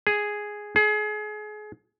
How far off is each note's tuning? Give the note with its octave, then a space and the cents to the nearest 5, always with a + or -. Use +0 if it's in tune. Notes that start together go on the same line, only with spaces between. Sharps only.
G#4 +0
G#4 +30